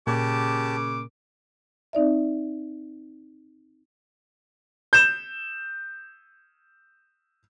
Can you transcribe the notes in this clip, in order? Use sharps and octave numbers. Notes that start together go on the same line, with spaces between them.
A#2 C#3 G4 A5 D6
C4 D#4 D5 E5
G6 E7